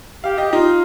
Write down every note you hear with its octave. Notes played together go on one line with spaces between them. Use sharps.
G4 F5
G4 D#5
D#4 F4